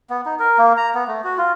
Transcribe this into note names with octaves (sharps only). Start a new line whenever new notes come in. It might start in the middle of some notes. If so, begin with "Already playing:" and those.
B3
D#4
A#4
A#3
A#5
B3
A3
F#4
F4